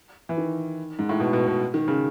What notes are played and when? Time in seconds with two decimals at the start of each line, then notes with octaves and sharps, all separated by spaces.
0.29 E3
0.38 D#3
0.99 G#2
1.09 A2
1.20 B2
1.33 B2
1.47 B2
1.74 D#3
1.88 C#3